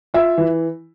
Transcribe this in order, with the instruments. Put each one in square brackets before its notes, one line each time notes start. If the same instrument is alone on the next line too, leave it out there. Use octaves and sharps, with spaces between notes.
[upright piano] F4 [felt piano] E5
[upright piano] E3